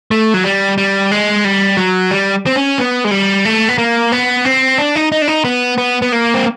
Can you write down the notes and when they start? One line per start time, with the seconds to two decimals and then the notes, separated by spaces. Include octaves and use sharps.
0.11 A3
0.34 F#3
0.44 G3
0.78 G3
1.11 G#3
1.45 G3
1.77 F#3
2.11 G3
2.46 C4
2.56 C#4
2.78 B3
3.05 G#3
3.11 G3
3.45 A3
3.69 B3
3.78 A#3
4.12 B3
4.45 C4
4.78 D4
4.95 D#4
5.12 D#4
5.22 D4
5.28 D#4
5.45 B3
5.78 B3
6.02 B3
6.12 A#3
6.34 C4